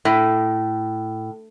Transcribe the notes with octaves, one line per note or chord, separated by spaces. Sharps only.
A2